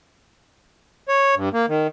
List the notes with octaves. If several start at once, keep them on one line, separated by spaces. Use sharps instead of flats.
C#5
G2
A#3
D#3